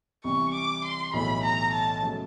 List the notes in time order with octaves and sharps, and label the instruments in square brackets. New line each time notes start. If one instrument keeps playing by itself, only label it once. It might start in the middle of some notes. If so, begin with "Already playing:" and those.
[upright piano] C2 C3 E3 [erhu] C#6
[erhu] D6
C6
[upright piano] B1 A2 E3 A3 [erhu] B5
[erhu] A#5
A5
[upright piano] C#3 F#3 A3